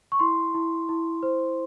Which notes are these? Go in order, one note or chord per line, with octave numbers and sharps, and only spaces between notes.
C#6
E4 C6
E4
E4
C5